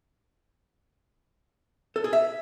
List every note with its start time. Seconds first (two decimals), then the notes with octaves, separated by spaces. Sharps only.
1.96 A4
2.04 G#4
2.13 E5